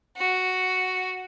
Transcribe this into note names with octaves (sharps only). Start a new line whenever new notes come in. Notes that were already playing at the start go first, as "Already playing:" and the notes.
F#4